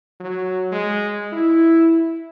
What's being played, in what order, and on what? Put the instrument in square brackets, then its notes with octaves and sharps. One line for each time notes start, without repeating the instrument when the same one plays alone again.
[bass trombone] F#3
G#3
E4